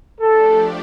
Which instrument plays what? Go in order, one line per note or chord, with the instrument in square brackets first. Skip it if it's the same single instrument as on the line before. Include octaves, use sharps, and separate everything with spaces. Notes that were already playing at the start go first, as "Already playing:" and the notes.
[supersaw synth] F3 A3 D4 G4 D5 [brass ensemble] A4